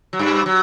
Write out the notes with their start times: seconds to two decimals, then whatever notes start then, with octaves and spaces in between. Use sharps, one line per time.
0.13 F#3
0.19 G2 G3
0.46 F#3